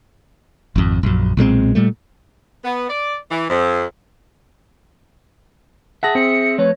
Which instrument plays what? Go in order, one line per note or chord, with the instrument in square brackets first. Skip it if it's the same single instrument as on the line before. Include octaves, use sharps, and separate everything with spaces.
[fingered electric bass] G#1 F2
A#1 F#2
B1 A#2 G#3 C4
A#2 G3 A3
[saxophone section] B3
D5
E3
F2
[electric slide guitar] G#4 E5 [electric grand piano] F#5 A5 A#6
[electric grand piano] C4 [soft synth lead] C#7
[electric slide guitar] F3 A3 B4 [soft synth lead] C#5